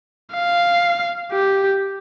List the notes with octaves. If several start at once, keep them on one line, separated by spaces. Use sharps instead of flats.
F5
G4